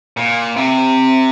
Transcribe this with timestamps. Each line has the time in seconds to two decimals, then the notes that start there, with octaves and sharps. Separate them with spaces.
0.17 A#2
0.56 C3